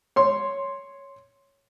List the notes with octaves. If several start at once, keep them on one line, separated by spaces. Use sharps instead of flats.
C#5 C6